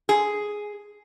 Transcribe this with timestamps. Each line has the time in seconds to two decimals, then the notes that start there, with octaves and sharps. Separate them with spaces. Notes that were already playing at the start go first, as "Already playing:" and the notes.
0.09 G#4